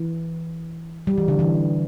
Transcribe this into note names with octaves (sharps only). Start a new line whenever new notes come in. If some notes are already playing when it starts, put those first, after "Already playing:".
Already playing: E3
G3
E3
D3
E3